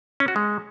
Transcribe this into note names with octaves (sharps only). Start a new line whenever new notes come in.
C#4
F#4
G#3